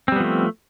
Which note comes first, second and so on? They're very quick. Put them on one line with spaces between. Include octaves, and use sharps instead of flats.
C4 G3 B3 F3 A3